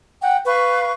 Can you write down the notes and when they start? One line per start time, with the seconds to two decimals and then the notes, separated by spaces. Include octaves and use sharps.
0.22 F#5 G5
0.46 B4 F5 C#6